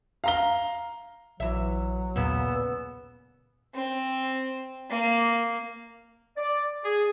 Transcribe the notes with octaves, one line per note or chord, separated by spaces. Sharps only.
F5 A#5 G7
A#1 E3 F#3 E5
D#2 A#2 C#3 B3 E6
C4
A#3
D5
G#4